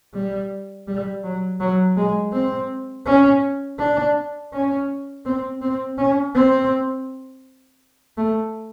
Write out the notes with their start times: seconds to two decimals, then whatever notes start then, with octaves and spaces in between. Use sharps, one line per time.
0.14 G3
0.87 G3
1.24 F#3
1.60 F#3
1.97 G#3
2.33 C4
3.06 C#4
3.79 D4
4.52 C#4
5.25 C4
5.61 C4
5.98 C#4
6.35 C4
8.17 A3